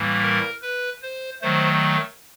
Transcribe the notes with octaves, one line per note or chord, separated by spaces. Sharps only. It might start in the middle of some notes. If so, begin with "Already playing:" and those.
Already playing: A2 E3 G3 A#3
A#4
B4
C5
D#3 F#3 A3 C5